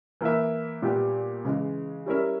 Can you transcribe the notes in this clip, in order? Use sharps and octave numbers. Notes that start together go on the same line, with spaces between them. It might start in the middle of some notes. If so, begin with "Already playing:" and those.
E3 A#3 E4 A#4 E5
A#2 G3 B3 G4
C#3 E3 G#3
G3 C#4 E4 A#4 E5